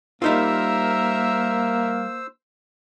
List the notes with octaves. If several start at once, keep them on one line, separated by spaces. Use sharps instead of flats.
G3 A#3 D#4 F4 A#4 C5 E5 E6